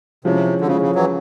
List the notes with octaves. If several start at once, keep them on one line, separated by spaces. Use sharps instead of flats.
C3 F3 G#3 C#4 E4
D3
C#3 F3 G#3 C#4 E4
C#3
E3 F#3